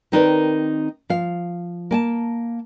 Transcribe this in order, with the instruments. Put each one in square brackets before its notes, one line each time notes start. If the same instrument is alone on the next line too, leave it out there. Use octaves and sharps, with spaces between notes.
[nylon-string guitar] D#3 C4 D#4 A#4 B4 D5
F3 F5
A#3 G#5 A5